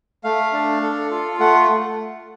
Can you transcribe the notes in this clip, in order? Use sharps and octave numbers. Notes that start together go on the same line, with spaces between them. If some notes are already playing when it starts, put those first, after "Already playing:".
A3 F5
D4
A4
F4
A3 F#5